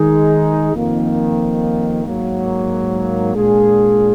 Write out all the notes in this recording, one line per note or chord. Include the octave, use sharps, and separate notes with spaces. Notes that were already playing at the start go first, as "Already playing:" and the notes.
Already playing: D#3 G#3 D#4 G#4
F2 D#3 A#3
G#2 F#3 A#3
A#2 G#3 D4 F4 G#4